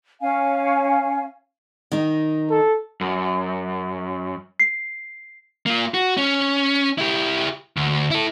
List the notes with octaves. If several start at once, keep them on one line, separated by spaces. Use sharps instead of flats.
C#4 F5 G#5
D#3 D#4
A4
F#2
C7
A#3 F4
F#4
C#4
E4 G4
D2
E4 A4